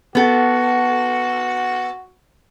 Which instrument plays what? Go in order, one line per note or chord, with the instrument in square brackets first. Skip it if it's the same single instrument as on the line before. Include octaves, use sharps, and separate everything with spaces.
[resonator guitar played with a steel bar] B3 A4 [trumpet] F#4